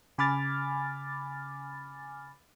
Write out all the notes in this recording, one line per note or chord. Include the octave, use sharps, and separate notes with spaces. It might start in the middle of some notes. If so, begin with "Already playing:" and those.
C#3 G#5 B5 D6 F6 A6